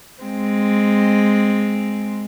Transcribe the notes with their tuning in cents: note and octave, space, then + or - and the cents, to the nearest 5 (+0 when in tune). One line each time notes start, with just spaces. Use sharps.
G#3 +0 C4 +0